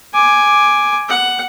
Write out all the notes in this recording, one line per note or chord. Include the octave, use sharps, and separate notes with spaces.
G#5 D6
F#5